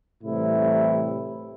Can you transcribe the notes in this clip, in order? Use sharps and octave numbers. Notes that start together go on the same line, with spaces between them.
A2 C3 E3 G3 E4